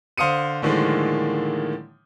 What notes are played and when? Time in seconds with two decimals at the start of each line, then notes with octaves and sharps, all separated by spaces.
0.18 D3 C5 F5 D#6 C#7 D#7
0.62 A2 D3 D#3 F3 G#3 A#3